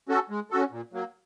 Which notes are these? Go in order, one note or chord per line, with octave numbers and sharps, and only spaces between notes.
C#4 F#4 A4
G#3
C#4 F#4 A4
A#2
F#3 A#3